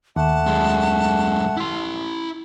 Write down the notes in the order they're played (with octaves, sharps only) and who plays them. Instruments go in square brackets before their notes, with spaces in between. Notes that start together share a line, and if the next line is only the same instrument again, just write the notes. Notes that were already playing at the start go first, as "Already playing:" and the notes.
[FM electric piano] D#2 [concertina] A3 F#5 [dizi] A5
[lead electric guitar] F#2 G#3
E4 C6